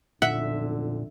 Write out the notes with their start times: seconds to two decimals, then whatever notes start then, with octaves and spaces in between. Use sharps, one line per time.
0.22 B1 F2 A#2 D3 E5 F#5